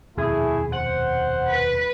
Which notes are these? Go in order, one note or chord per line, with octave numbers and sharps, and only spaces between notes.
D#1 F2 B2 A3 E4 G#4
C5 F#5
B4